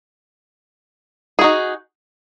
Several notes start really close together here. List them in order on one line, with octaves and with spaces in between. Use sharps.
G#4 F#4 D#4